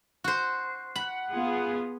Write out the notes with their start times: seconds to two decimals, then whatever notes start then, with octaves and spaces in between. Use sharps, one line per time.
0.24 F#4 C5
0.96 F#5 B5
1.29 B3 F4 G#4